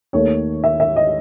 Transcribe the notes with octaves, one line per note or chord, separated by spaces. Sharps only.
D#2 D#3 A3 C#5
E5
E5
D#5